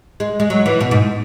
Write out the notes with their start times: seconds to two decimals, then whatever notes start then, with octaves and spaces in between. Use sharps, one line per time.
0.20 G#3
0.40 G#3
0.50 F#3
0.66 E3
0.80 B2
0.91 G#2